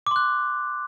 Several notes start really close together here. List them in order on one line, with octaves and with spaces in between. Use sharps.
D6 C6 F#6